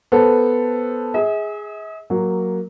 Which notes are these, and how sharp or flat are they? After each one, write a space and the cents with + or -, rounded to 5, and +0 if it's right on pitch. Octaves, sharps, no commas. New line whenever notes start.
B3 +0 A4 +0 C5 +0
G#4 +0 E5 -45
F#3 +0 A#3 +0